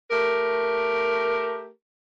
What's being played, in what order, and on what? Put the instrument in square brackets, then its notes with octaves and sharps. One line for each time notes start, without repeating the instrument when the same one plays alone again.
[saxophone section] A3 G4 A#4